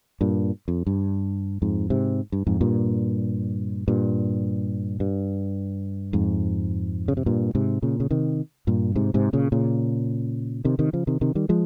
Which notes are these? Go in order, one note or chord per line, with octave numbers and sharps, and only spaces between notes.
G2 A#2
F2
G2
F2 G#2
G#2 C3
G2
F2 G#2
G2 A#2
G2 A#2
G2
F2 G#2
C#3
C3
G2 A#2
G#2 C3
A#2 C#3
C#3
C3 D#3
G2 A#2
G#2 C3
G#2 C3
A#2 C#3
A#2 C#3
C3 D#3
C3 D#3
C#3 F3
C3 D#3
C3 D#3
D#3 G3
F3 G#3